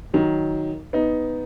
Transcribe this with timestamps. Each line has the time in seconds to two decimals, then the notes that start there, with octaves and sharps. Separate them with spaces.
0.14 D#3 F#3
0.93 B3 D#4